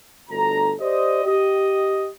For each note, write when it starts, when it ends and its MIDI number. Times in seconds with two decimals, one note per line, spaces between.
0.29 0.72 31
0.29 0.72 38
0.29 0.72 69
0.29 0.72 82
0.80 1.24 67
0.80 1.24 72
0.80 1.24 74
0.80 1.24 75
1.25 2.08 67
1.25 2.08 75